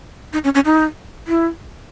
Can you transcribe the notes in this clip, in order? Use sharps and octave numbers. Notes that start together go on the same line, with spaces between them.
D#4
C#4
C#4
D#4
E4